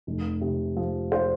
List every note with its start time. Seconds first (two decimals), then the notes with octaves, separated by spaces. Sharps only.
0.07 F1
0.41 C3
0.76 F3
1.12 C5